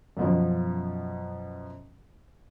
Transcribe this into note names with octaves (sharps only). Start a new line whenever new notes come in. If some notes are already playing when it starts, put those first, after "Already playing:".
F#2 B2 F3